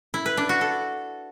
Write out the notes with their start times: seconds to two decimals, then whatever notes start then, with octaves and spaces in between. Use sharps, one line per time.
0.14 E4
0.26 B4
0.37 D4
0.49 F#4
0.61 A4